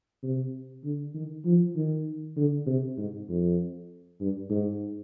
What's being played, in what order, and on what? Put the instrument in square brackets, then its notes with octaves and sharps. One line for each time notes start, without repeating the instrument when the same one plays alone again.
[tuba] C3
D3
D#3
F3
D#3
D3
C3
G#2
F2
G2
G#2